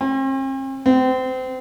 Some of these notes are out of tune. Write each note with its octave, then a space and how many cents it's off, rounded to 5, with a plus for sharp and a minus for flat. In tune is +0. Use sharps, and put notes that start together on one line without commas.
C4 +45
C4 -30